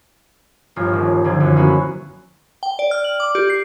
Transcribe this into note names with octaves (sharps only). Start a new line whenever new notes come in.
A#1 G2 F4 C#5 G#5
D#1
A#1 D3 D#3 F3 G#6
F#2
A#3 B3 C#4 E4 F#4
G5
D5
F6
F#7
D6
G4
C7